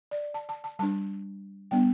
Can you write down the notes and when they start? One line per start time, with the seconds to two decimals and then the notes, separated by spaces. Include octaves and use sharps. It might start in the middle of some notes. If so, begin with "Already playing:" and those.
0.11 D5
0.34 A5
0.49 A5
0.64 A5
0.79 G3 D4 A5
1.71 G3 B3 D4 G5